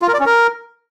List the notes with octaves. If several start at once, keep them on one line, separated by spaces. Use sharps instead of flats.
F4
A#4
D5
C#4
A#4